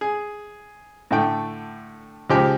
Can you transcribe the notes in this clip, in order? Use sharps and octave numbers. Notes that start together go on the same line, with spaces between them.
G#4
A2 D3 A3 G5
C#2 F3 G#3 G4 G5